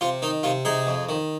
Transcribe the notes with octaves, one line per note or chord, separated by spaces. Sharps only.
C3 F4
D#3 D#4
C3 F4
C3 D#4 G#4
F2
D#3